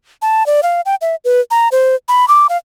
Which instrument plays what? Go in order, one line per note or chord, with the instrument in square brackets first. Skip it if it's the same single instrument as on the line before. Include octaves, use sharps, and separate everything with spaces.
[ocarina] A5
D5
F5
G5
E5
B4
A#5
C5
B5
D6
F5